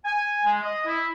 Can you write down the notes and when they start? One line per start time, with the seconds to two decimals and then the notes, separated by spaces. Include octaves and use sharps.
0.05 G#5
0.45 G#3
0.62 D#5
0.85 E4